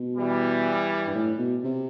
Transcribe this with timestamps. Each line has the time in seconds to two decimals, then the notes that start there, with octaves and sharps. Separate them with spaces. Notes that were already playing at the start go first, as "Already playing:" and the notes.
Already playing: B2
0.17 E3 G3
1.07 G2
1.15 A2
1.38 B2
1.64 C3